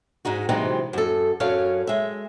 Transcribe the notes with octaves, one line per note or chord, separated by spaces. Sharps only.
G#2 G#3 D#4 F#4
C3 E3 F#3 G#3 C4 D#4
F#2 A4
F#2 C#4 A4 C#5 F5
G#3 E5